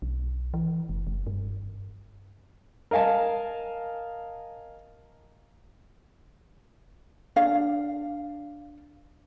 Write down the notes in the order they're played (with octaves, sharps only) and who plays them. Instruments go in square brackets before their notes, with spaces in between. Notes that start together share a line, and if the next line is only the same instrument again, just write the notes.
[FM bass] B1
E3
F#1
F#1
G2
[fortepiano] A#4 D#5 F5 G#5 A5
[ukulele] D4 F5